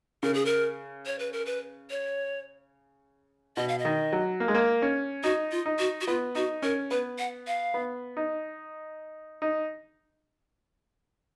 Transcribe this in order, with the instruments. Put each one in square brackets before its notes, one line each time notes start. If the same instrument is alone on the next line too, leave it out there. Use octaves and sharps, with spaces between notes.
[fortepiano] C#3 [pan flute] A#4
[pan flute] G#4
A#4
C#5
B4
A#4
B4
C#5
[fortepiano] B2 [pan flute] D#5
[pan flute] F5
D#5
[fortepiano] D#3
F#3
A#3
G#3
A#3
C#4
[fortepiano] D#4 [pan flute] F#4
[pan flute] F4
[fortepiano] D#4
[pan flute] F#4
F#4
[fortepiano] B3 [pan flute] F4
[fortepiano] D#4 [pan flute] F#4
[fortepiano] C#4 [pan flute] A#4
[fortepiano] B3 [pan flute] B4
[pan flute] F#5
F5
[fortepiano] B3
D#4
D#4